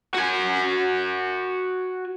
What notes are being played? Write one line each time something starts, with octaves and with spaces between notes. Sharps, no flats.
F#4 G#5